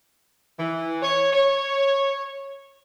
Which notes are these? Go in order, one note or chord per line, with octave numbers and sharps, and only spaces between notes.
E3
C#5
C#5